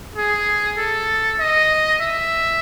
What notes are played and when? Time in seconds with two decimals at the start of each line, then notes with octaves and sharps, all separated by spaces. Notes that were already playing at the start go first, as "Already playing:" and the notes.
0.16 G#4
0.78 A4
1.40 D#5
2.01 E5